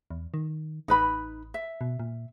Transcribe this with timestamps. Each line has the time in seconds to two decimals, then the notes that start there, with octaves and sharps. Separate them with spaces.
0.11 E2
0.34 D#3
0.88 A1 D#4 B4 B5
1.54 E5
1.81 B2
2.00 A#2